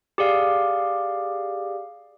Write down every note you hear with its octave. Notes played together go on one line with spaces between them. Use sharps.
G4 G#4 D5 F5